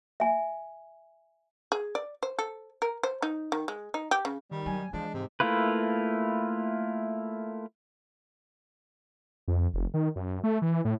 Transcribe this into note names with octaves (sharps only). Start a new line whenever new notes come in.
E5 G#5
G#4
D5
C5
A4
A#4
C5
D#4
D#3
G#3
D#4
G4
C#3
D#3 G3
G2 F#3 G#5
E3 F3 G#3 D4
G#2 C3
A3 A#3 E4 F4 B4
F2
F1
D#3
F#2
A3
E3
A2